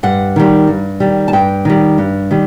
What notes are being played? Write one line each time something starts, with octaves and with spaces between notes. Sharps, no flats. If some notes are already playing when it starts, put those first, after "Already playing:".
G2 F#5
D#3 G3
G2
D#3 G3
A5
G2 G5
D#3 G3
G2
D#3 G3